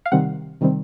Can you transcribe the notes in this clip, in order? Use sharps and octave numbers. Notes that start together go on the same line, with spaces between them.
F5
C3 D#3 G3 C4 F#5
C3 D#3 G3 C4